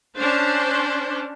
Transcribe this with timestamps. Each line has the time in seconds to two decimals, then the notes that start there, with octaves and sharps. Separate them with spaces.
0.17 C#4 D4 C5